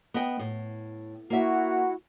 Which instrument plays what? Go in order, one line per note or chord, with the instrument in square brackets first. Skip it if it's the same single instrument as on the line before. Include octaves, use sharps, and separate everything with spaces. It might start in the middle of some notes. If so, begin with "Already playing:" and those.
[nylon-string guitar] B3 D#5 G5
A2
[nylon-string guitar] A#3 E5 [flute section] E4 F#4 F#5